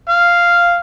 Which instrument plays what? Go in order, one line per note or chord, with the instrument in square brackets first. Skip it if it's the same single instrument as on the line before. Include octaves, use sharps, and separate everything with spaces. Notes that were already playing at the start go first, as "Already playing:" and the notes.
[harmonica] F5